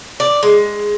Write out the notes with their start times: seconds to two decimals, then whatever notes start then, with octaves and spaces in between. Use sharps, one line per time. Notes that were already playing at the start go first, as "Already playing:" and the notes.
0.20 D5
0.43 G#3